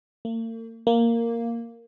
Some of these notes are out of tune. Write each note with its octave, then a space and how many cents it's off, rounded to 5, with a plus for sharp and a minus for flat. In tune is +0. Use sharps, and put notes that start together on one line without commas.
A#3 -45
A#3 -5